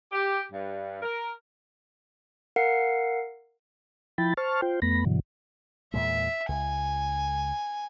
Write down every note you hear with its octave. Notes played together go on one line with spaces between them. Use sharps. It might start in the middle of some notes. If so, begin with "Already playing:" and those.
G4
G2
A#4
A#4 F5 F#5 C7 C#7
F3 E4 G5 B5 A6
C5 A5 C#6 F6
F4 C5 G5
F2 A3 B3 B5 A#6
G2 B2 D3 E3 F#3
E2 A#2 G#3 E5
C#2 G#5